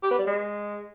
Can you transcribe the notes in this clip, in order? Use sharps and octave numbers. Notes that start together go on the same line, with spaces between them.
G4
B3
G3
G#3